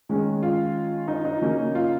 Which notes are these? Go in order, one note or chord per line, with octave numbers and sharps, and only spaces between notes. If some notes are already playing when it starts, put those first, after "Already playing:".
D#3 G#3 C#4
F4
D#4
D#4
C#3 F#3 A#3 C#4
F4